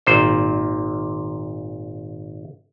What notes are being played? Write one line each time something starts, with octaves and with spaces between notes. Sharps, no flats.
G#1 A#2 C5